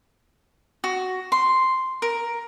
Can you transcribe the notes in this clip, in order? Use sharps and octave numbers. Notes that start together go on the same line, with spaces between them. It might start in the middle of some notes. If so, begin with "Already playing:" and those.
F#4
C6
A#4